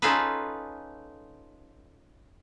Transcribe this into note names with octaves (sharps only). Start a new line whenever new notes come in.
C#4 D#4 F4 G#4 A4 B4